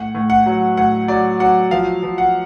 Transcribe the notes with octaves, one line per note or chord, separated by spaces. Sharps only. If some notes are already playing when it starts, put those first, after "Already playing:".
Already playing: A2 F#5
A2
F#5
F#3
A2 F#5
F#3 D5
F#3 F#5
F3 F5
F3
F#5